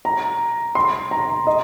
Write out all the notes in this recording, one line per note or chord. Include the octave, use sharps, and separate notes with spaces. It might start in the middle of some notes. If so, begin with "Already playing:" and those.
A#5
C6
A#5
D#5